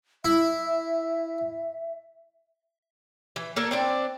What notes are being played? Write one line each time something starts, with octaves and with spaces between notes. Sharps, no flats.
E4 E5
E3
A#3 D4 A4 A#4
C4 D4 D5